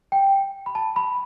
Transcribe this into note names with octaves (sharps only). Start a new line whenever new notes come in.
G5
B5
A5
B5